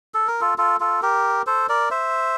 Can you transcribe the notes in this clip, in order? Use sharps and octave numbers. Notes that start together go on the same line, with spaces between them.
A4
A#4
F4 A4
F4 A4
F4 A4
G4 A#4
A4 C5
A#4 D5
C5 E5